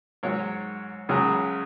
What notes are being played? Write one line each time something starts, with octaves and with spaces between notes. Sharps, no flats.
G#2 F#3 C#5
C#2 C#3 F#3 G#4